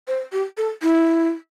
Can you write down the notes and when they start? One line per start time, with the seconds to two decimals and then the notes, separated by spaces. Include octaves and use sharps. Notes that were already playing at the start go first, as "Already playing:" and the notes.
0.08 C5
0.33 G4
0.57 A4
0.83 E4